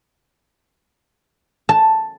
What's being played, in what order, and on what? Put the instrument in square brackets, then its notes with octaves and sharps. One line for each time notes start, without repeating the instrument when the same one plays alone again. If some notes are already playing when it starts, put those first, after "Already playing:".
[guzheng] A5